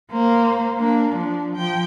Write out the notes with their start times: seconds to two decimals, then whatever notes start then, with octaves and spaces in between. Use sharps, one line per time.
0.11 A#3 C5
0.78 A#3 D4
1.15 F3 D4
1.55 F3 G5